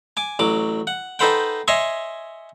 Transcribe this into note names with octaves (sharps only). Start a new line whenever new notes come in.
G#5 D6
A1 F#3 D6
F#5
D#4 A4 B4 C5 F#5 G5
C#5 D#5 E5 G#5 C6 C#6